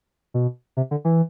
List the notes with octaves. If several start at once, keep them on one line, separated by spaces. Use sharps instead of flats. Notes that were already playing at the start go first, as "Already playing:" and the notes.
B2
C3
D3
E3